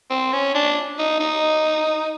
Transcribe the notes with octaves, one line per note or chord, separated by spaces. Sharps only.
C4
C#4
D4
D#4
D#4